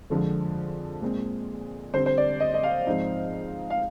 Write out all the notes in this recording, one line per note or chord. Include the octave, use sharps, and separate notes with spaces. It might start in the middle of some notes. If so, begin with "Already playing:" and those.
F2 D3 F3 G#3
A#2 G#3 C4
D3 G3 C4 C5
C5
D5
D#5
D#5
F5
G#2 F3 C4 D#4
F5